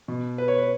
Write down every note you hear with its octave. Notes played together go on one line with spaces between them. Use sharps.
B2
B4
C#5
B4